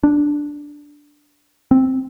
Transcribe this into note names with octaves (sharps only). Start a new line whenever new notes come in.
D4
C4